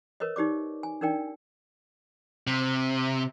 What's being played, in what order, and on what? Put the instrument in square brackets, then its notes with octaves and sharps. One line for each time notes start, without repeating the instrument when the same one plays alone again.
[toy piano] A#4 B4 C#5 D#5
D#4 G4 D5 D6
G#5
D4 D#4 A#4 D5 G5
[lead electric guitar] C3